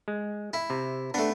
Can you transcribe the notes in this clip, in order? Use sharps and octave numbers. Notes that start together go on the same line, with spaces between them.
G#3
E4
C3
A3 B3 D4